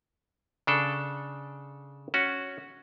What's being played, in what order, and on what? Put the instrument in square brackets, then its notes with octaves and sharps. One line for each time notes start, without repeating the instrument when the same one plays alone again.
[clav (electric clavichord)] C#3 D4 A4
C#4 F#4